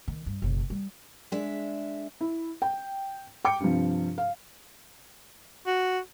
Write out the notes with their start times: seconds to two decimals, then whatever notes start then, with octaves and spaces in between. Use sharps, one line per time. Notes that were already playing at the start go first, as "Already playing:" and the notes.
0.08 D#3
0.26 G2
0.42 F#1 B1
0.70 G3
1.32 G#3 D4 E5
2.21 E4
2.62 G5
3.45 G5 D6 C#7
3.60 G2 C3 F3
4.18 F5
5.66 F#4